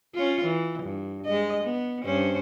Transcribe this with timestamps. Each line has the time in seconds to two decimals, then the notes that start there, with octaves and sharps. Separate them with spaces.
0.15 C#4 F4
0.45 E3
0.83 G2
1.25 G#3 D#5
1.64 B3
2.04 G2 C#4 C5